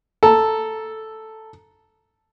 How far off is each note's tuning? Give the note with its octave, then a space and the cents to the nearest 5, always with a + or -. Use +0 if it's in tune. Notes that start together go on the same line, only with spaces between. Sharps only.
A4 +0 A#5 +5